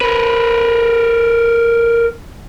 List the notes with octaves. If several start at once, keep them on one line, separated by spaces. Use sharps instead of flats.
A#4 B4